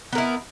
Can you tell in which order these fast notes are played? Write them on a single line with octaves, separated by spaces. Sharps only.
B3 A#4 E4